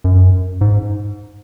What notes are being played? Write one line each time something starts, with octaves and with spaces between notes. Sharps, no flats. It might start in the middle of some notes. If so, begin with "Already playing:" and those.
F#2
G#2